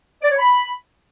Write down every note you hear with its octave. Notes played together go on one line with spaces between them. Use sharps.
D5
C#5
B5